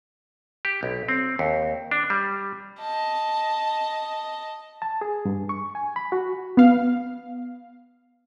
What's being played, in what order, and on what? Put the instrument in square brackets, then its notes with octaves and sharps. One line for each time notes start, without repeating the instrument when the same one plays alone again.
[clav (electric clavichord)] G4
B1
C4
D#2
D4
G3
[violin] D#5 A5
[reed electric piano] A5
G#4
G2
C#6
G#5
B5
F#4
[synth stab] B3 F5